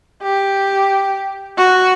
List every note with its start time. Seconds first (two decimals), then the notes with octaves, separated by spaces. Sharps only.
0.22 G4
1.58 F#4